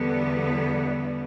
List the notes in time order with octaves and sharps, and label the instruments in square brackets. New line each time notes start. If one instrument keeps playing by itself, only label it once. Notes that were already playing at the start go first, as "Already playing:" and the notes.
Already playing: [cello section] E2 D3 G3 B3